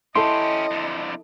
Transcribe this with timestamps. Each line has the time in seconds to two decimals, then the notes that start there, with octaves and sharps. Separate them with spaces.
0.16 C#4 E4 G4 A4 D#5 C6
0.71 F2 D3